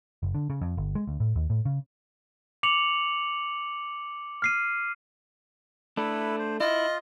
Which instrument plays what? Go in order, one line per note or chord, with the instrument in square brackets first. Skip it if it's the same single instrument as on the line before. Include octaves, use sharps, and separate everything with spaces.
[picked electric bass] F#1
D3
C#3
F2
G1
G#3
D2
A2
D#2
A2
C#3
[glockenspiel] D6 C#7 F7 F#7
F6 C7 D#7
[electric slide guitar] A3 D4 [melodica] E4 A4 B4
[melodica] C5
[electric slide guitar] E4 [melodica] F4 [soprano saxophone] D#5